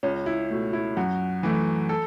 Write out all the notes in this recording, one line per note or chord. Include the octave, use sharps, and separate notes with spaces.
C#2 C#4
E4
B2 A3
E4
F#2 F#4
E3 A3
A4